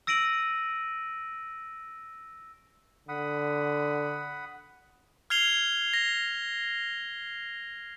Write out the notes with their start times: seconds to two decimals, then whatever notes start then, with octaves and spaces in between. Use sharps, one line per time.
0.07 E6 A#6 D7 D#7 F#7
3.09 D3 F#5 B5 D#6
5.30 F6 G#6 C7 F7 G7
5.94 A#6